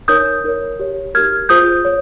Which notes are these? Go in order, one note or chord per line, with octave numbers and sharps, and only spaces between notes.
D#4 A#4 C#5 D#6 G6
D#4 A#4 C#5
G4 C#5
D#4 G4 A#4 F6 G#6
F4 G#4 C5 D#6 G6
C#5